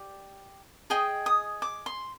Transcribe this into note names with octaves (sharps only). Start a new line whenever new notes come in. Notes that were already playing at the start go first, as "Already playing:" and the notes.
Already playing: G4 D5
G#4 D#5 G5
D#6
D6
C6